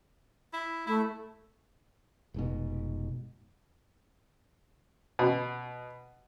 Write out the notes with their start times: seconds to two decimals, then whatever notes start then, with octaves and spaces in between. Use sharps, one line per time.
0.53 E4
0.87 A3 E4
2.34 F1 G#2 B2
5.19 B2